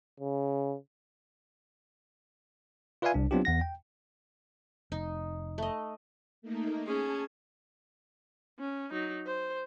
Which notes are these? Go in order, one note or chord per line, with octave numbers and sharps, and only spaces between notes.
C#3
F4 B4 D5 E5 F5 G#5
C2 D4
F#3 B3 C4 D4 F4 G4
E2 F#5 A#6
G5
F1 D#4
A3 D#5
A3 A#3 D#4
C#4 G#4 A5 G#6
C#4
F#3 D#4
C5